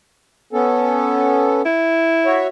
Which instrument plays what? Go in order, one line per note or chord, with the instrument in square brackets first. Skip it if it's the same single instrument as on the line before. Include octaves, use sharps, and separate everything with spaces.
[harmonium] B3 C#4 A4
[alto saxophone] E4
[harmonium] F#4 C#5 E5